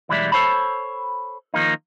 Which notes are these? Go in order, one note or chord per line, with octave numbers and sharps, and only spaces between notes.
B1 E3 G3 G#3 D5 E5
A4 A#4 C5 C#5 A5 B5
D#3 F3 A#3 D#4